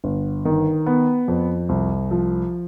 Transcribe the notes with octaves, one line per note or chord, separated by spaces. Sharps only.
G1
D#3
B3
F2
C2
F3